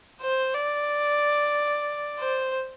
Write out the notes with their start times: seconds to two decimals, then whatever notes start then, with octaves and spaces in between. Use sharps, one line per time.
0.22 C5
0.54 D5
2.20 C5